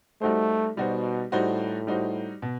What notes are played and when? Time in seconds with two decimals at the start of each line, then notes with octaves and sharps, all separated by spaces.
0.21 G3 A3 D#4 F#4 C5
0.77 B2 G3 D#4 F#4 C5
1.32 A2 G3 D#4 F#4 C5
1.87 G3 D#4 F#4 C5
2.42 B2